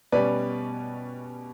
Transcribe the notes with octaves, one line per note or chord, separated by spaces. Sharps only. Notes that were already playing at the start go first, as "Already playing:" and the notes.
B2 G3 C#4 B4 D5